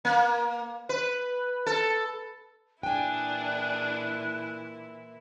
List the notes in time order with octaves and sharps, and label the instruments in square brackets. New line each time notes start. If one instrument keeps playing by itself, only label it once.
[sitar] A#3
B4
A4
[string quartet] A#2 E3 E4 [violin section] D4 G#4 [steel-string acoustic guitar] G5 G#5 [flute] F#6